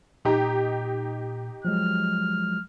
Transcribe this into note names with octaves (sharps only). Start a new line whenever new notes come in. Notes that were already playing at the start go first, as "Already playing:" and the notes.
A#2 D#4 G4 A#5
F3 F#3 G#3 F6